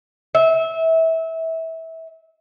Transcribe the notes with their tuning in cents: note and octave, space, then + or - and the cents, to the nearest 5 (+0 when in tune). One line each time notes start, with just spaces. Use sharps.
E5 -25